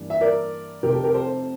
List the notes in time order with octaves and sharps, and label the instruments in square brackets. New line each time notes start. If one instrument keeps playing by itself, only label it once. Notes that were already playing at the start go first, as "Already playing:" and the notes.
Already playing: [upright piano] G2 E3 A#3 D4
E5
A#4 D5
F1 F2 C3 G4 A#4
A4
G4 A#4
A4 C5